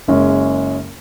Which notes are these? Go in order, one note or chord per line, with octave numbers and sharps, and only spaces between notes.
F#1 F#2 C#3 G#3 C#4